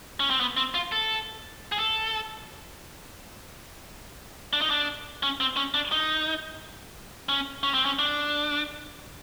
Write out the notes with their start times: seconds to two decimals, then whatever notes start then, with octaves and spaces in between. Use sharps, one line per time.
0.20 C#4
0.30 C4
0.40 B3
0.57 C4
0.74 F4
0.92 A4
1.72 G#4
1.78 A4
4.53 D4
4.62 D#4
4.70 D4
5.23 C#4
5.40 C4
5.57 C#4
5.74 D4
5.92 D#4
7.29 C#4
7.63 C#4
7.74 C4
7.85 C#4
7.99 D4